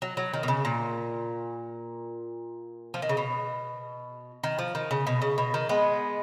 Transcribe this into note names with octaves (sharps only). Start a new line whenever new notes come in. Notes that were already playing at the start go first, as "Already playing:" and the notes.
F#3
F#3
D#3
B2
C#3
A#2
F3
D#3
C#3
B2
D#3
F3
D#3
C#3
B2
C#3
B2
D#3
G#3 B3